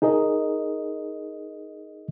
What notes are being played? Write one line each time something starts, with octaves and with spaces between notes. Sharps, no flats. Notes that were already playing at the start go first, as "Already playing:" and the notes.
D#4 G#4 A#4 D#5